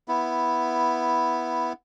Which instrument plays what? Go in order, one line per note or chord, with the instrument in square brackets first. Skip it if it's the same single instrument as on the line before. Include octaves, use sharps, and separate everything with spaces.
[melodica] B3 E4